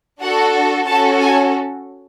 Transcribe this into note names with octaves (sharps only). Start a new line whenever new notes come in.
D4 F#4 A4 F#5
C#4 F#4 A4 A5
G#5